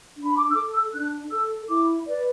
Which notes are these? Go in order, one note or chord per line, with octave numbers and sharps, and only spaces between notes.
D4
B5
D6
E6
A4 D6
E6
D4 F#6
A4 E6
E4 D6
B4 D5